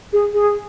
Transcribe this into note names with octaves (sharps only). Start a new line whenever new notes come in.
G#4
G#4